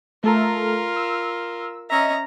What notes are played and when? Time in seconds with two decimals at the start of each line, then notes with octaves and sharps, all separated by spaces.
0.24 A3 F4 A4 A#4 A#5
0.96 E6
1.90 C#4 D#5 E5 A#5